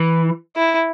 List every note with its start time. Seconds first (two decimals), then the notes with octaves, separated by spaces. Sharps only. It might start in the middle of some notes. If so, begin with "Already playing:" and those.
Already playing: E3
0.56 E4